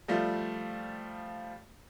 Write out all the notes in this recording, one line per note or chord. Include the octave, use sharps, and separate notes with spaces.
F3 G3 A3 F4